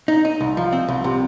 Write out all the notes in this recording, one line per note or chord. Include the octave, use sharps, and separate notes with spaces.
D#4
D#4
C2
F3
C4
C2
C3